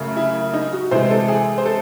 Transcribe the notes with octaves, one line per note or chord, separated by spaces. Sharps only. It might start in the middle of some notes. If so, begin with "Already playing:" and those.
Already playing: F#2 C#3 A3
E4
D#4
F#4
C3 E3 G#3 C5
A4
G#4
C5
A4